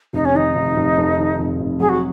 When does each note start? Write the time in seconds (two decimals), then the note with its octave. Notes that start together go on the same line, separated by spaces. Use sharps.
0.13 F1 D#4
0.25 C#4
0.34 D#3 D#4
0.55 F1
0.76 F1
0.98 F2
1.18 D#3
1.39 F1
1.60 F1
1.80 F#3 G#4
1.89 F#4